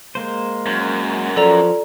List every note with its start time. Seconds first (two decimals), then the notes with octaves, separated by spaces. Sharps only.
0.15 G#3 A#3 C5
0.66 F#2
1.36 F3 A4 D5 A#5